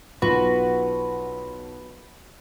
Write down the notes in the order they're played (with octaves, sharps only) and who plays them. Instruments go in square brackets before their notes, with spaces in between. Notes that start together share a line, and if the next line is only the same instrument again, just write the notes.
[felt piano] B1 [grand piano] F4 [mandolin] F#4 [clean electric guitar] B4